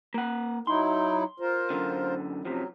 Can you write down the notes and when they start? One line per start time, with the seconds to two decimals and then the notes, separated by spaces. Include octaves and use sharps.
0.14 A#3 F#5
0.67 F#3 D#4 E4 C6
1.40 F4 A#4 C5
1.70 F#2 D3
2.45 F#2 C3 F3 F#3